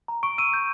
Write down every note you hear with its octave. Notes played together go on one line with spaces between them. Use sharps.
A#5
C#6 D7
E6 D#7
G6